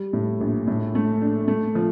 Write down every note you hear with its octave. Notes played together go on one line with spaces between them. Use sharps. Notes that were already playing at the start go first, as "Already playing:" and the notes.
Already playing: G3
A2
A#1
A2
A3
D4
A3
F3